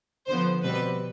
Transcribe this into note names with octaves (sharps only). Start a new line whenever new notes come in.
D3 F3 B3 C5
B2 G3 C4 B4